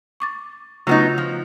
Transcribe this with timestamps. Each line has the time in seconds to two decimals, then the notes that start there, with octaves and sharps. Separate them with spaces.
0.20 C#6 D6 A6
0.87 C#3 F#3 A3 B3 D#4 F4
1.18 F3